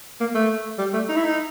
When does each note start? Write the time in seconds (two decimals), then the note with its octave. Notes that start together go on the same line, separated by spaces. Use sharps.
0.20 A#3
0.35 A3
0.78 G3
0.93 A3
1.09 D#4
1.16 E4
1.24 D#4